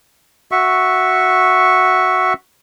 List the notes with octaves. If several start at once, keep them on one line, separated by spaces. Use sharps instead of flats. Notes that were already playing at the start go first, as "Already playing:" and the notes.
F#4 E5 C#6